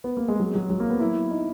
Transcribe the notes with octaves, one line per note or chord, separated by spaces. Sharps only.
B3
A#3
G#3
F#3
F#3
F#3
A#3
B3
E4
D#4